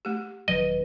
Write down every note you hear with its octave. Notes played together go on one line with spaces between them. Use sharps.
A3 G4
E1 D#3 F#3 B4 D#5